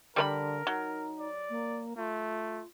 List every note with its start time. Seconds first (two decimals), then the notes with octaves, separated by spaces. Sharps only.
0.16 D3 G3 A#4 B4 B5
0.67 F#3 D#4
1.19 D5
1.50 A#3
1.97 A3 F4